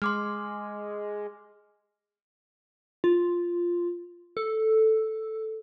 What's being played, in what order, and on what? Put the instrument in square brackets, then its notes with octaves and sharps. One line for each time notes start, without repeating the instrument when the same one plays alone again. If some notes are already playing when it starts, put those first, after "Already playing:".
[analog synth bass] G#3 [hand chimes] C6 D6 F6
[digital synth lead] F4
A4